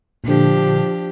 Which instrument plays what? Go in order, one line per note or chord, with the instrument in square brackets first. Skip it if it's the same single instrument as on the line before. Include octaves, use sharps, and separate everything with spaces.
[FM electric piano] A#2 D3 [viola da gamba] F3 D4 G4